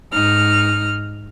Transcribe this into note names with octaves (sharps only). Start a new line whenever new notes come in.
G#2 D#4 F6